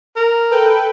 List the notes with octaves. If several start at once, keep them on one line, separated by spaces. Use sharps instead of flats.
A#4
A4 B4 G5